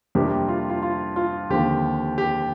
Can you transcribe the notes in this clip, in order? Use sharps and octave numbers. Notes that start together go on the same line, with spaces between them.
F2 C3 G3 A#3 D4 G4
F4
F4
F4
F4
D#2 D3 F3 C4 G4
G4